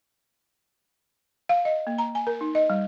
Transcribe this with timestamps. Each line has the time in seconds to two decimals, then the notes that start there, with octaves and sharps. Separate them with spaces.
1.49 F5
1.65 D#5
1.87 A#3
1.98 A#5
2.15 G#5
2.27 A#4
2.41 D#4
2.55 D#5
2.70 G3